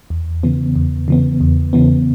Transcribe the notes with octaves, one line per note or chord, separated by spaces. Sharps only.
E2
C#3 E3 B3
E2
C#3 E3 B3
E2
C#3 E3 B3